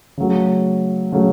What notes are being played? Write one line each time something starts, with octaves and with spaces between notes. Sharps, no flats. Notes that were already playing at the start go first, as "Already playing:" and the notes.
C#3 F#3 A3
C#3 F#3 A3